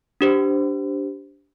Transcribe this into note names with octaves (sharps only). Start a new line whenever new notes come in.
D4 G4 C5